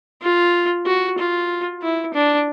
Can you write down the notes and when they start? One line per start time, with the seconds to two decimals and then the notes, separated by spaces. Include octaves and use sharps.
0.22 F4
0.86 F#4
1.18 F4
1.82 E4
2.14 D4